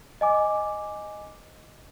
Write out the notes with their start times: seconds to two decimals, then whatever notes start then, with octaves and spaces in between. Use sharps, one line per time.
0.21 D#5 G#5 D6